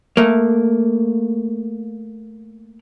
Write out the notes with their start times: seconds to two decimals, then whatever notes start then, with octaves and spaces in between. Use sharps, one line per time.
0.17 A3 A#3